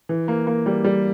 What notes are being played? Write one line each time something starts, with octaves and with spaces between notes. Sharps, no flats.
E3
A#3
A#3
G3
G3